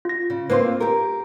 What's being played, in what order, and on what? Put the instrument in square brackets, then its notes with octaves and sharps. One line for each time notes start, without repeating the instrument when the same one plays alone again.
[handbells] F4 A#6
[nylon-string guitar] C#3
[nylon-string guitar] A#3 C4 F4 [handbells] B4 C5 C6
[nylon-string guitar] G4 A#4